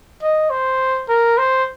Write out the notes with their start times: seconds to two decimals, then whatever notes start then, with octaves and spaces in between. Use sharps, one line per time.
0.22 D#5
0.50 C5
1.09 A#4
1.38 C5